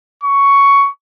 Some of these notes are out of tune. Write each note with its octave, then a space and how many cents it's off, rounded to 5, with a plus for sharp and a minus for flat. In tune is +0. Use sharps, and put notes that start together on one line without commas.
C#6 +10